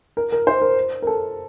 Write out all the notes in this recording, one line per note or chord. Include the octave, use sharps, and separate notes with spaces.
A#4
A#4
C5
A#4
A#4
A4